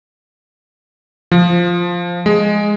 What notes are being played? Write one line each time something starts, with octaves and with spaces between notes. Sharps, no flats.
F3
G#3